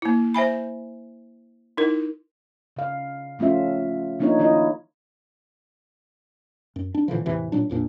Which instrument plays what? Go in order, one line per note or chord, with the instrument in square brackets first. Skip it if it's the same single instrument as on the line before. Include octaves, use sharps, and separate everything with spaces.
[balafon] A#3 E4
C5 E5 G#5 B5
D#4 E4 A#4
[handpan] C#3 F5
F3 A3 C#4 F4 E5
F3 A#3 D4 D#4 F4 C#5
D#3 E4 F4 D#5
[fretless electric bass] F#2
D4
A#2 D3 E3 F3
E2 A2 C3 E3
A#2 F#3 D4
A#1 F2 A#2 D4